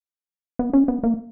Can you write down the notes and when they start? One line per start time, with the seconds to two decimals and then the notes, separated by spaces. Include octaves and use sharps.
0.59 B3
0.73 C#4
0.88 B3
1.03 A#3